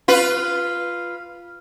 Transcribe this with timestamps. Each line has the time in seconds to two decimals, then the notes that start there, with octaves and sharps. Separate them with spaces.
0.08 F4 B4